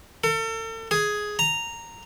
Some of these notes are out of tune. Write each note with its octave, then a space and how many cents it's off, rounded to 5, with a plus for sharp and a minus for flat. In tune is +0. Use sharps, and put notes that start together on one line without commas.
A4 +40
G#4 +5
A#5 -5